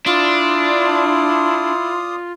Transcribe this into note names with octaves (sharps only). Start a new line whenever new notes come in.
D4 E4 F4 D5 C6 D#6